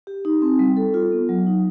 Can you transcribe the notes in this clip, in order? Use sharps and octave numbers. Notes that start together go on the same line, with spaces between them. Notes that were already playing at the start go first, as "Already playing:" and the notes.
G4
D#4
C4
G3
A4
F4
B3
F#3
D#4